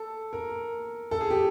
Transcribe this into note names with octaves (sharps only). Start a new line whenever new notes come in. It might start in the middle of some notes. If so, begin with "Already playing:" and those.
Already playing: A4
A#4
A4
G#4
G4